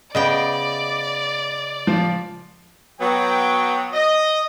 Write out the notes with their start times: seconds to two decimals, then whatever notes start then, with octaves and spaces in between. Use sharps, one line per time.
0.15 C#3 B3 D5 D#5 G5
1.87 F3
3.00 F#3 B3 G5
3.93 D#5